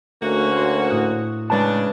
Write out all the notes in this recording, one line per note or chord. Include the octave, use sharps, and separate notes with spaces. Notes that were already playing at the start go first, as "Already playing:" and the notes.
D2 A3 A#3 C#4 F#4
C#5 C6
A2 D#6 F#6
C#3 G#3 D4 B4 A5